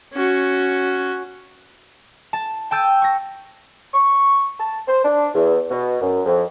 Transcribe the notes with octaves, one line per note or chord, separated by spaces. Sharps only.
C#4 F#4
A5
G5 A5 E6 G6 D#7
C#6 A#6
C#6
A5
C5
D4
E2
B2
F#2
F2